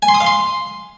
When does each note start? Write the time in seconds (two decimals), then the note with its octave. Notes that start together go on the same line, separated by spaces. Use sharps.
0.02 G#5
0.08 C6
0.14 D#6
0.20 F5
0.26 C6